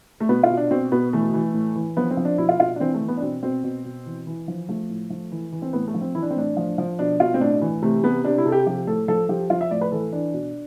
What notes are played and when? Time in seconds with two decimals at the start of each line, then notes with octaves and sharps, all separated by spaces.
0.20 A3
0.29 B2 B3
0.43 F4
0.50 B2
0.57 D4
0.71 B2 C4
0.92 B2 B3
1.13 E3 A3
1.34 E3
1.54 A2
1.76 E3
1.97 F3 B3
2.11 C4
2.17 F3
2.25 D4
2.38 B2 E4
2.49 F4
2.59 B2 F4
2.76 D4
2.80 E3 C4
2.94 A3
3.01 E3
3.08 B3
3.17 D4
3.22 B2 C4
3.43 B2 C4
3.64 B2
3.85 B2
4.06 E3
4.27 E3
4.48 F3
4.69 F3 A3
4.90 A2
5.10 F3
5.32 E3
5.52 E3
5.62 C4
5.73 A2 B3
5.87 A3
5.94 F3
6.01 C4
6.15 E3 E4
6.23 D4
6.30 C4
6.36 A2 D4
6.57 F3
6.78 F3
6.99 B2 D4
7.20 B2 F4
7.34 C4
7.40 A2 D4
7.61 E3
7.82 C3 A3
8.03 C3 B3
8.24 C3 D4
8.38 E4
8.46 C3 A4
8.52 G4
8.67 F3 G4
8.87 A2 A4
9.08 F3 A4
9.29 F3 G4
9.50 F3 F4
9.61 E5
9.71 A2 D5
9.81 B4
9.92 E3 A4
10.13 E3 D4
10.34 B2